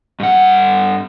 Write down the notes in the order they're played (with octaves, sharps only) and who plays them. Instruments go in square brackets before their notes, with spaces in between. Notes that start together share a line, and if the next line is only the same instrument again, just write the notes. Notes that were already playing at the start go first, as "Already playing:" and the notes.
[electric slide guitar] G2 F#5